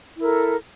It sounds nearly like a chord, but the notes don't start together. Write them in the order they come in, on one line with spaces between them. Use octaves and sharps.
E4 A#4 A4